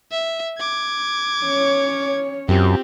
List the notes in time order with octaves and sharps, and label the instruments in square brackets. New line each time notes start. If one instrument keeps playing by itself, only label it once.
[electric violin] E5
D6 G#6
[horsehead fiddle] C#4 C#5
[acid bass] F#2 [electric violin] C4 [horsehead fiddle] F4 G4